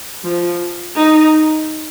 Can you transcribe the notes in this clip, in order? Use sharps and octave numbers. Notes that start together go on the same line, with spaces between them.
F3
D#4